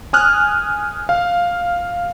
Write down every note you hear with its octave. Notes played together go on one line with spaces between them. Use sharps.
G#5 D#6 F6 F#6
F5